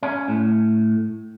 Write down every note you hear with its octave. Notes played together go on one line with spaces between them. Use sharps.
C#4
A2